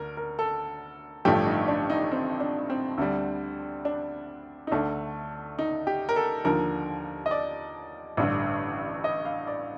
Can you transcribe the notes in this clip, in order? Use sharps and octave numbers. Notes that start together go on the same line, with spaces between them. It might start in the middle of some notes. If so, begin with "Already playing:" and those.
Already playing: D2 D3 A#4
A#4
A4
A1 G2 D3 F3 A3 G4
D#4
D4
D#4
C4
D4
C4
D2 D3 G3
D4
D#4
D2 D3 A3 D4
D#4
G4
A#4
A4
D#2 D3 F3 A#4
D#5
D5
A1 G2 D3
D#5
F5
D5